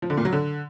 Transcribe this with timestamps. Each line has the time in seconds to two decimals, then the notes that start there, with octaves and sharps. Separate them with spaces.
0.02 F3
0.10 D3
0.17 A#2
0.25 F#3
0.33 D3